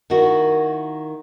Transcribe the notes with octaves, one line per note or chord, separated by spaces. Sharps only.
D#3 A#3 E4 F#4